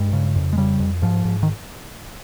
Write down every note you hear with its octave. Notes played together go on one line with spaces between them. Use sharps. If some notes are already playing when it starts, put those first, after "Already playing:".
Already playing: G2 G#3
C#3
F2
G#3
C#3 G3
F2
G#2 F3
G#2
D#3